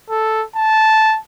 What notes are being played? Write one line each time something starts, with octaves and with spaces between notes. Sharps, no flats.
A4
A5